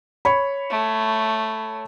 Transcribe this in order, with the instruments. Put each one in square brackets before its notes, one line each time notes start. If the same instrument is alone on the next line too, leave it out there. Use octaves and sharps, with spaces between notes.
[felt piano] C#5 B5
[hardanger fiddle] A3